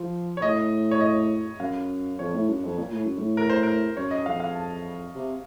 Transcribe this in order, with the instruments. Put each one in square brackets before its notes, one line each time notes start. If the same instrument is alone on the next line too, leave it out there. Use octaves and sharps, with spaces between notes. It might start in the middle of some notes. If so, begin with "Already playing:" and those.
Already playing: [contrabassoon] F3
[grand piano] C#5
[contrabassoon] A2 [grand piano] D#5
[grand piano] C#5
D#5
[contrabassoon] F#2 [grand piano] F5
[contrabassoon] F2 [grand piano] C#5
[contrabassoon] A2
F#2
F2
A#2
A2
F#2
A2
[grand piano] A#4
C5
A#4
[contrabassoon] F#2 [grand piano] C#5
[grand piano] D#5
[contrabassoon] F2 [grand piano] F5
[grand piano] F5
A5
[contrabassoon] C3